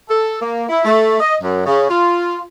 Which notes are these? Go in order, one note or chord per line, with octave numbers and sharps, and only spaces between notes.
A4
A#3
E4
A3
D#5
F#2
C#3
F4